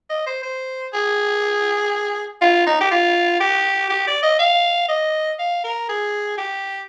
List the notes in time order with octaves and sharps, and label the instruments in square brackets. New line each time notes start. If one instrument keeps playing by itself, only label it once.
[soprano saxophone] D#5
C5
C5
G#4
F4
D#4
G4
F4
G4
G4
D5
D#5
F5
D#5
F5
A#4
G#4
G4